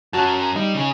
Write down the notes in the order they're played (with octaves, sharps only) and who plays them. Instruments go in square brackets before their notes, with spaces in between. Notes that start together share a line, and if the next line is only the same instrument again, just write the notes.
[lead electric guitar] F#2 F#3 [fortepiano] F#4 A5
[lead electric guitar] G3 [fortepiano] D#4
[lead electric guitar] C#3 G#4